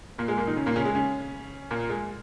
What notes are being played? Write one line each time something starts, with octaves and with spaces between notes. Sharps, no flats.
A#2 A#3
G#3
A#2 A#3
D#3 D#4
C#3 C#4
A#2 A#3
C#3 C#4
G#3
C#3 C#4
A#2 A#3
G#3